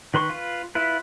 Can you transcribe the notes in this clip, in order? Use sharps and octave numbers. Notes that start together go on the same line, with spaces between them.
D#3 B4 C6 C#6
F4 B4
E4 F4 B4